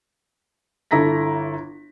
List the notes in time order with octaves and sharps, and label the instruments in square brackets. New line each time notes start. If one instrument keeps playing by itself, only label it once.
[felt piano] G1 E4 A4 A#5 A#6 B6